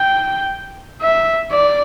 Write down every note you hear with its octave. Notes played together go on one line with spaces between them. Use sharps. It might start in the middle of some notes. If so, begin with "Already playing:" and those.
Already playing: G5
E5
D5